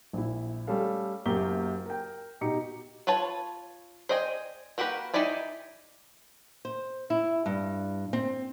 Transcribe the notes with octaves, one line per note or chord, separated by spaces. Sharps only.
A#1 E4
G3 A3 C#4 A4 F5
F#1 F#2 A#3 F#4 G4 G7
A#4 G5
B2 D#4 G4 A#5 C#7
F4 B4 C#5 A5
C5 D5 D#5 G5 G#5
A#3 F#4 G4 A#4 B4
D#4 E4 G4 D5 G#5
C5
E4
G2
C4